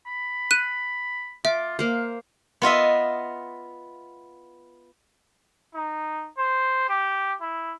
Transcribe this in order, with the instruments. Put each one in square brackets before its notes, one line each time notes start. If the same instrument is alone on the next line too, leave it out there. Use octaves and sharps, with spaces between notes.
[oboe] B5
[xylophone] F#6 D#7
[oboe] F4 [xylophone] E5 [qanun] D6
[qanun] A#3 C5 [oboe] F5
[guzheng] B3 F4 D#5 E5
[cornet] D#4
C5
G4
E4